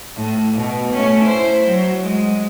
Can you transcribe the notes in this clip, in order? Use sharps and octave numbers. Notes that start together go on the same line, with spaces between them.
A2
B2
A3 C#4
E4 C5
F#3
G#3